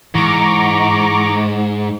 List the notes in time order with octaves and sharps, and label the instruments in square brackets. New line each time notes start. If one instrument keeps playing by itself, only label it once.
[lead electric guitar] G#2 [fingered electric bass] E3 [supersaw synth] A#5 C#6 D6